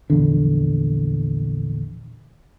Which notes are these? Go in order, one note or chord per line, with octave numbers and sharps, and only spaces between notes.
A#1 E2 D3